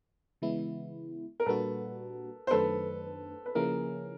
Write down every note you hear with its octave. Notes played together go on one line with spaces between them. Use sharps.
C#3 E3 G#3 B3 E4
A#4
A#2 G3 A#3 D4 F#4 A4 B4
C5
F#2 D#3 F#3 A3 D4 A4 B4
B4
C#3 F3 A#3 C#4 E4 G#4 A#4